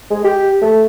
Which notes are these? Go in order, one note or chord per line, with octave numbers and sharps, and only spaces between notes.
G#3
G4
A3